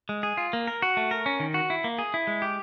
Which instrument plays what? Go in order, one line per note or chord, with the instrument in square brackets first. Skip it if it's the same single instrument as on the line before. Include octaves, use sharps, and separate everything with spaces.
[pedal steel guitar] G#3
G#4
F4
A#3
A#4
F#4
A3
A#4
C#4
D#3
F#4
E4
A#3
G#4
E4
G#3
G4